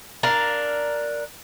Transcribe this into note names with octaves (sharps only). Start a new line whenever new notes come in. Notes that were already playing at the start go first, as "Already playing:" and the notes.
D4 A#4 F5